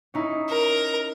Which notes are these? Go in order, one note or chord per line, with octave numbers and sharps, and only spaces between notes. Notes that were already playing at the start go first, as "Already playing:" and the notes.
C#4 D#4 E4
A#4